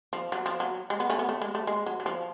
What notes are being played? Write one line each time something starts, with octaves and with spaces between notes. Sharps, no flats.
F3
F#3
F3
F#3
G#3
B3
A3 C#4
B3
A3
G#3
A3
G#3
F#3
F#3
F3